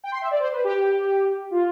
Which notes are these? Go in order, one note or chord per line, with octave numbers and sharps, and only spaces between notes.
G5
C6
E5
D5
C5
B4
G4
F4